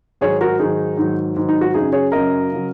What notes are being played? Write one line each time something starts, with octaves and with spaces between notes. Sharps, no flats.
G#2 D#3 F#3 G#4 C#5
F#4 A#4
G#2 D#3 F#3 D#4 G#4
G#2 D#3 F#3
G#2 D#3 F#3
D#4
F#4
F#2 C#3 F#3 D#4 G#4
G#4 C#5
F#2 C#3 F#3 A#4 D#5
C#3 F#3